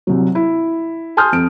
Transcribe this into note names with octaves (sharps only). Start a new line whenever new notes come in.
C2 F#3
E4
G#5 A5 C6 D#6 F6 G6
F2 D7